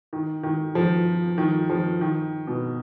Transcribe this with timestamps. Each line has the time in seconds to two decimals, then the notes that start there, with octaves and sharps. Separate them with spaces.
0.13 D#3
0.43 D#3
0.75 F3
1.38 D#3
1.69 F3
2.01 D#3
2.47 B2